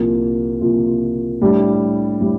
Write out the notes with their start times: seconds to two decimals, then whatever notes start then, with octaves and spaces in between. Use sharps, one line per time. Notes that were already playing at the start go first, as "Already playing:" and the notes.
Already playing: C2 A#2 F3 A#3 F4
0.61 C2 A#2 F3 A#3 F4
1.42 A2 G3 D4 G4
2.21 A2 G3